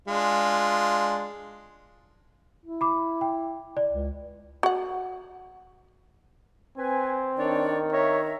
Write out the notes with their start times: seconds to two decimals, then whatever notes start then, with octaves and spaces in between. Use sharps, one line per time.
0.08 G#3 D4 F4
2.66 E4
2.81 B5 D6
3.21 G5
3.77 D5
3.92 C#2
4.63 F#4 F#5
6.77 C4 B4 G#5
7.38 D#3 D4 C#5 D5
7.92 C#5 E5 A#5